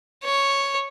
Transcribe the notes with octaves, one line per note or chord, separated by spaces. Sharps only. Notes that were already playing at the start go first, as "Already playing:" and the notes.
C#5